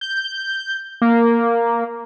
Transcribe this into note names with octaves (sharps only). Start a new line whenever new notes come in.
G6
A#3